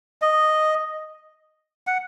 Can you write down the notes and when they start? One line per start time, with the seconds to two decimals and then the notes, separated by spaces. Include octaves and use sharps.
0.22 D#5
1.87 F#5